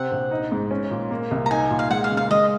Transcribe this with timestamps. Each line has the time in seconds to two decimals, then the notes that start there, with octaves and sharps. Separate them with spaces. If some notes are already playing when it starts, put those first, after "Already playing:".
Already playing: C3 C4 F#5
0.11 A#1
0.31 D#4
0.52 G#2
0.71 C#4
0.91 A#2
1.11 A#3
1.31 C2
1.46 A#5
1.51 D#4 G#5
1.70 A#2
1.79 F5
1.90 G#3 F#5
2.04 F5
2.11 F#1
2.17 F5
2.30 G#3 D#5